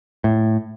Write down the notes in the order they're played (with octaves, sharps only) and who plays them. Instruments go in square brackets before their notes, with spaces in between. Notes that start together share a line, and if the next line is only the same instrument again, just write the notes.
[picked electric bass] A2